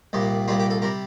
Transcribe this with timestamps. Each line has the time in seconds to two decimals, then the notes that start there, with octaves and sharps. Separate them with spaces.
0.13 C2 A#2 G3
0.48 C2 A#2 G3 F4
0.60 G4
0.70 A4
0.82 C3 G3 A#4